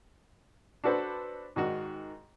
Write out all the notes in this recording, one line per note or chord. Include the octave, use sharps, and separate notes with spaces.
D4 F#4 A4 B4 C5
G#2 D#3 F#4